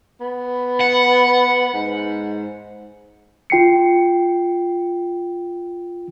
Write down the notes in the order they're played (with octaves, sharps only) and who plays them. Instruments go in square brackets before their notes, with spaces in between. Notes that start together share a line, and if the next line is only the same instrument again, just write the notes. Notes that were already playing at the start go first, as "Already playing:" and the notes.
[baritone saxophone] B3
[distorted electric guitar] F#5
[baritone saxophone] G#2
[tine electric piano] F4 G5 C7 C#7